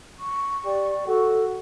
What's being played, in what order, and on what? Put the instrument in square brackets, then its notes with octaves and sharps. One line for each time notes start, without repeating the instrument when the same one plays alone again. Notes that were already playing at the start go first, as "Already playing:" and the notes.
[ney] C#6
[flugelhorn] G4 [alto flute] D5
[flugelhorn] F#4 [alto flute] A4